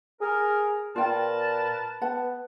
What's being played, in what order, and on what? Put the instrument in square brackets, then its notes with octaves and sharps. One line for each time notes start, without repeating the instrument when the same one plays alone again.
[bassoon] G#4 [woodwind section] A#4
[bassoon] A#2 [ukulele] F4 G5 [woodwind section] A#4 B4 A5
[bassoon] B3 [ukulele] F#5 A5